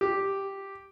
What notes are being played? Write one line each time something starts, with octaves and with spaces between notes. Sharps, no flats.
G4